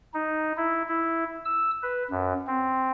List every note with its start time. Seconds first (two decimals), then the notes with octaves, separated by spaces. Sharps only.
0.14 D#4
0.57 E4
0.88 E4
1.45 E6
1.83 B4
2.11 F#2
2.47 C4